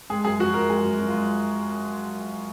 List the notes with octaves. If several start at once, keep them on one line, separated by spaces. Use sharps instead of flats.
G#3 G#4
F#2 G#4
F3 F#4
F#2 A#4
G#3 G#4
F#2
F#2
F4
G#3